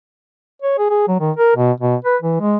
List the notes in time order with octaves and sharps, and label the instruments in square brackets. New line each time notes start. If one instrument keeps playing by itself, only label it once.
[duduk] C#5
G#4
G#4
F#3
D#3
A#4
B2
B2
B4
E3
G#3